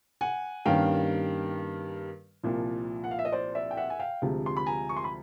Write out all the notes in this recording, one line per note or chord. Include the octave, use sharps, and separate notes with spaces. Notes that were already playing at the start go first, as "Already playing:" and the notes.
F#5 G#5
G2 D#3 G3 A#3 C#4 F5 G5
C2 A#2 F3
F#5
F5
E5
D#5
C5 D5
D5 E5
G5
E5 F#5
G#5
F5 G5
D2 C3 F3 G#3
C6
B5
G#5 A#5
C#6
C6
B5